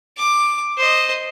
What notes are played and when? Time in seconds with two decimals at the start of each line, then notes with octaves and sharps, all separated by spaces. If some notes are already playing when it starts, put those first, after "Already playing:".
0.18 D6
0.78 C5 D#5